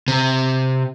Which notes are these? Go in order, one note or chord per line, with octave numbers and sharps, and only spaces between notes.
C3